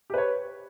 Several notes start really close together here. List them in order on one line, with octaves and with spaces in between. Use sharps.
G4 B4 C#5